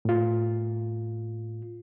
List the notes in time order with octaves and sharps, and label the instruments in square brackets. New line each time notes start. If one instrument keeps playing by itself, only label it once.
[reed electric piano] A2 F4